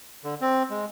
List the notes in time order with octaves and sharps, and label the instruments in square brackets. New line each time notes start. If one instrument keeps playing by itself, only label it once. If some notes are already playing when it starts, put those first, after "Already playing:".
[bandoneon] D3
C4
G#3